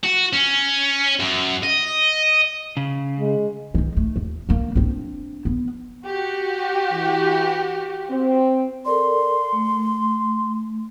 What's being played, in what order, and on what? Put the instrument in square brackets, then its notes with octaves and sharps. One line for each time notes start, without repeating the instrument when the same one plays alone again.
[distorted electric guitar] F#4
C#4
F#2
D#5
[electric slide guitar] C#3
[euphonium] G#3
[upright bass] D#3 E3
A3
D#2
D3 A#3
C4 D4
B3
[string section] F#4 G4
[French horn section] E3
C4
[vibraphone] A4 A#4 D5 [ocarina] C6
[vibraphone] A3